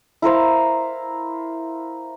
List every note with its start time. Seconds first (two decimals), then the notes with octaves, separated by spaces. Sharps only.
0.22 E4 A#4 C5 F5